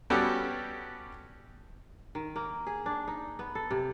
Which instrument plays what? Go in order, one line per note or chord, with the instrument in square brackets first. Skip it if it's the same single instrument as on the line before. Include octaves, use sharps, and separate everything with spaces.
[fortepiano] G3 B3 C#4 F#4 G4 A4
[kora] D#3
A#3
G#4
D4
D#4
B3
A4
C3